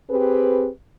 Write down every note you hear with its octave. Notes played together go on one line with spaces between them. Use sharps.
C4 G4 G#4 B4